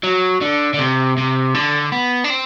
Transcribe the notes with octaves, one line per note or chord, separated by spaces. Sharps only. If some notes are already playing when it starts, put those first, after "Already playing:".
F#3
D3
D3
C3
C3
D3
B3
D4
C4